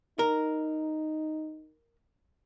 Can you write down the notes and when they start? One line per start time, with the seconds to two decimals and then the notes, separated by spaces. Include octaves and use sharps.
0.19 D#4 A#4